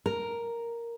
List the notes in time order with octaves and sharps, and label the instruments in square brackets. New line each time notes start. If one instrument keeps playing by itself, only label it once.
[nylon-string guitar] A#4